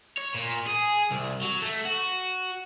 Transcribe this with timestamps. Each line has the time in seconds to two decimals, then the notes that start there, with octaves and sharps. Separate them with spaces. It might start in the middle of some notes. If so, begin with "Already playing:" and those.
0.17 C#5
0.34 A#2
0.67 G#4
1.11 C2
1.42 F#3
1.62 A3
1.85 F#4